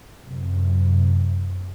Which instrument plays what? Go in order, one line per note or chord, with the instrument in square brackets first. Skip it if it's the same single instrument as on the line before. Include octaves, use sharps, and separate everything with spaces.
[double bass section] F#2 C3